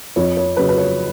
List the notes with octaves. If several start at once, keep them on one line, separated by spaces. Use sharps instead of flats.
F2 C#5
C#5
C#3 F#3 B4
B4
C#5